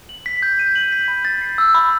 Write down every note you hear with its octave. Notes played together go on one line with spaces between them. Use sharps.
F#7
B6
G6
D#7
F#7
B6
B5
A6
C7
E6
B5